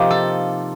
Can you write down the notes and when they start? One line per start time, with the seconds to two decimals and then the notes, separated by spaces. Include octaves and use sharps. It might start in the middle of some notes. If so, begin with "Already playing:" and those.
Already playing: C3 F3 A#3 D#4 F4 G4
0.10 A4